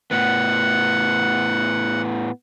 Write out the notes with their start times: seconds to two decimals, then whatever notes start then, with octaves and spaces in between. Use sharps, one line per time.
0.11 A2 B3 F#5